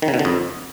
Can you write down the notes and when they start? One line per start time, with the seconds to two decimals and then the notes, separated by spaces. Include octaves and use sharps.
0.02 D#3
0.08 C#3
0.14 B2
0.19 D3
0.25 F2